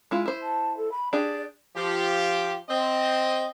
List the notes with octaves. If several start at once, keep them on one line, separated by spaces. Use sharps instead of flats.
G#3 E4 F4
E4 C5
A5
A4
B5
D4 G4 G#4 D5
F3 G4
C4 C5 D#5